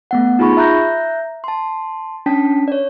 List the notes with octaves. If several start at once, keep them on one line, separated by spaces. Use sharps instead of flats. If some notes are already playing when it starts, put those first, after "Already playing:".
A3 B3 F#5
D#4 F4 G#4 B5 C#6
E5 A#5 F#6 G6 A#6
A5 C6
C#4 D4 G5 A5 B6
C#5 D5